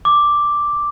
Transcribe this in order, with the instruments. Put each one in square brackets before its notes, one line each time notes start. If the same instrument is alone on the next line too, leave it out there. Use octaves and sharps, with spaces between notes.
[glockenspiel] D6